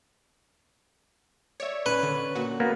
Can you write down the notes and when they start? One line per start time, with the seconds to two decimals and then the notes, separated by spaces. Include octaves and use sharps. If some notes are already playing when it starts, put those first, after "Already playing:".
1.60 C#5 D5 E5
1.86 C#4 B4
2.03 D3
2.35 A#2 F#4
2.60 A#3 B3